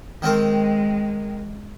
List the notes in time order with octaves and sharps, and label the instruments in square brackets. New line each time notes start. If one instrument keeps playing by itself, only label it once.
[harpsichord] D#3 C4 A#4 [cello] G#3